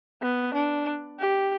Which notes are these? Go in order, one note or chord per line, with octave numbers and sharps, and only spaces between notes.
B3
D4
G4